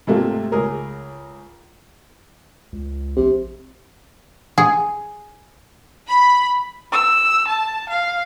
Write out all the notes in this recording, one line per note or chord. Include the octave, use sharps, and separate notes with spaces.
G#2 C3 A3 A#3 F4
C#2 G#4 A#4
C#2
A#1 C3
G#4
B5
E6
A5
F5